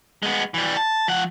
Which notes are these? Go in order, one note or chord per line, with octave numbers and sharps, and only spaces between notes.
G#3 B3
E3 G3
A5
F3 F#5